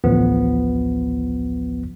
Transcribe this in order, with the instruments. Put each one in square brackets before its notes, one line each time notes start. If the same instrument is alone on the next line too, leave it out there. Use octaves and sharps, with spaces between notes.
[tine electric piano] A1 D2 F3 B3